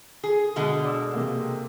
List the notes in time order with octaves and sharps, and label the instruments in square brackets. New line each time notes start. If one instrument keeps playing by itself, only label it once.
[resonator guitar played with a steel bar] G#4
B2 D3 G#3
[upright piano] D5 E6
C3 A#3